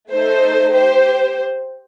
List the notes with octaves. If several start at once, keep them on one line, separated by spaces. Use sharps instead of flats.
A3 D#4 A4 C5
G4 C5